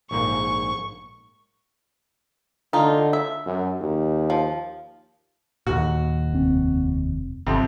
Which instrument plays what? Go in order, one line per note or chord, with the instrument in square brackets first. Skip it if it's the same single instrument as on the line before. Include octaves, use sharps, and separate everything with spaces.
[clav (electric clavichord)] A#1 G#2 A#3 [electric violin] C#6
[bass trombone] D3 [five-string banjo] A3 D#4 F4
[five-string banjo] E5
[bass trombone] F#2
D#2
[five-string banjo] F3
[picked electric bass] D#2 A#2 [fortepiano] F#4
[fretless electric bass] F1 C4
[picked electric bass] G1 [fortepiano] F2 C3